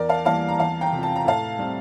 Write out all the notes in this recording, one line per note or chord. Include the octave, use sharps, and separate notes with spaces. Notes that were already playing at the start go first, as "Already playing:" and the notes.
Already playing: E2 A#4 D5
F5 A5
E3 G3 A#3 F5 A5
A#5
E2 F5 A5
G5 A#5
C3 F3
A5
A#5
A2 F5 A5
G3 C4